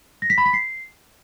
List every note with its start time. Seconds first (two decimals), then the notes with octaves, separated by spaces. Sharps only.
0.22 A#6
0.30 B6
0.38 B5
0.46 B6
0.53 C7